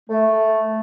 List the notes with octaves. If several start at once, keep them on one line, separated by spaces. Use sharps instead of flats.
A3